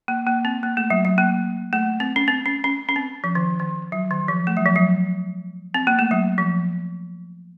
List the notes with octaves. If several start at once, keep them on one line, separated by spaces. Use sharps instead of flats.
A#3
A#3
C4
A#3
A3
F#3
F#3
A#3
A3
C4
C#4
C4
C#4
C#4
C#4
C4
F3
D#3
D#3
F#3
D#3
F3
A3
F#3
F3
F#3
C4
A#3
A3
F#3
F3